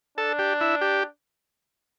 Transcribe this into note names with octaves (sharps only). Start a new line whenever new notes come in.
D4 A4
G4
E4
G4